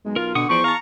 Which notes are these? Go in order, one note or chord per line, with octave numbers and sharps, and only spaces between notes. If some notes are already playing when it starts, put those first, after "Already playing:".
B1 G#3
F4 A#4
B2 D3 F#5 C#6 D#6
E2 F3 C5 D5 C#6
F5 A5 A#5